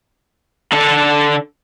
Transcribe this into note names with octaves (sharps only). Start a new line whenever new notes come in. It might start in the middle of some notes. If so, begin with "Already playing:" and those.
D3 A4